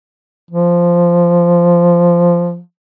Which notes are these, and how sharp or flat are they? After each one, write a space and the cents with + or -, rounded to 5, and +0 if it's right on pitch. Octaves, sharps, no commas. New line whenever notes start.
F3 -10